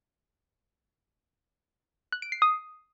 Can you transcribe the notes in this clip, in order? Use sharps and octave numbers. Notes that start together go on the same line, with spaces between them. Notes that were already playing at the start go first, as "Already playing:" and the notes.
F#6
D7
C7
D#6